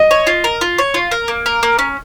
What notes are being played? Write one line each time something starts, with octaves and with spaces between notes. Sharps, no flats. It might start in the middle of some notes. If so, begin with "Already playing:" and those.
Already playing: D#5
C#5
F4
A#4
F4
C#5
F4
A#4
A#3
A#4
A#3
C#4